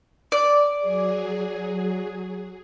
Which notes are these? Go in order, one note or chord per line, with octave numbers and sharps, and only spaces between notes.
D5
F#3 G#4